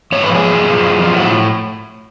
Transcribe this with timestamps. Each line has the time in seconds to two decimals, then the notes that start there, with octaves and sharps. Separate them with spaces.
0.12 G#2 C#5
0.23 B4
0.30 F3
0.35 G#4
0.47 F#2
0.65 F3
0.81 F#2
0.99 F3
1.16 A2 F#4